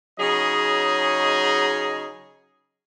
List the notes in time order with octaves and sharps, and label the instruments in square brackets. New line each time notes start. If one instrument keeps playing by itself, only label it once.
[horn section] C#3 F#3 D#4 G#4 C#5 D#5